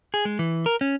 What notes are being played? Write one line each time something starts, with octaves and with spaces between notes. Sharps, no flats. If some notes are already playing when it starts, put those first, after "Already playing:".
G#4
G#3
E3
A#4
C#4